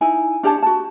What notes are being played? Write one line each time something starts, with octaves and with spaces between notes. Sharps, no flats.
D#4 E4 G#5
D4 G4 C#5 A5
F#4 A5